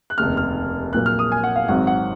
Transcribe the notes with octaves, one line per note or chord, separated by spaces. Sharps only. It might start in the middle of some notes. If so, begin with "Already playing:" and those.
F#6
F1 D#2 C#3 F6
F6
A#1 A#2 F#3 A#3 F#6
F6
D#6
G#5
F#5
F5
G#1 G#2 F#3 C4 F#5
F#5